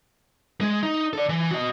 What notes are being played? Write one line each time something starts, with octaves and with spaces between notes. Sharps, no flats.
G#3
D#4
A4 D5
E3
F#4 D#5